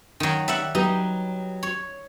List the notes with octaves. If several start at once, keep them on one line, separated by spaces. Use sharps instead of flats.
D#3 F#3
G3 E5 F#5
F#3 D#4 G4 B4
C#5